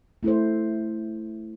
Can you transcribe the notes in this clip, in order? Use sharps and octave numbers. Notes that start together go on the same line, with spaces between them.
A3 E4 A4 C5